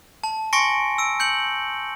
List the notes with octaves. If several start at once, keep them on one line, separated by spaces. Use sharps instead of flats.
A5
G#5 C6 C#6 A#6 C#7 D7
E6 D7
G6 C#7 F#7